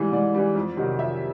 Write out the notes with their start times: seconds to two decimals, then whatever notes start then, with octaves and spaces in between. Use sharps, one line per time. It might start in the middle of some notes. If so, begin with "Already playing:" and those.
Already playing: G#2 E3 G3
0.12 G#2 D5
0.34 E3 G3
0.55 F2
0.77 C3 D#3 F#3
0.98 F2 E5